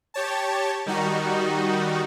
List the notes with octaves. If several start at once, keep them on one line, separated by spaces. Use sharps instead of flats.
G4 C#5 A5
D#3 G3 D#4 F#4